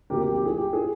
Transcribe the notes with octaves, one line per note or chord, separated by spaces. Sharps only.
D2 C3 F3 A#3 G4 A#4
G4
G4
G#4
G4
G#4